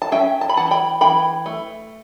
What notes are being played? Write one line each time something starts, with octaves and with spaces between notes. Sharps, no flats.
A5
C#4 E5 G5
A5
B5
E3 F#5 A5
G5 B5
E3 G5 B5
A3